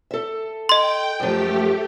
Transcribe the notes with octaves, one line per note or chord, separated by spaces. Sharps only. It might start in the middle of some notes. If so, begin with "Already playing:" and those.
A4 E5
D#5 G5 C6
F#2 F3 A3 G4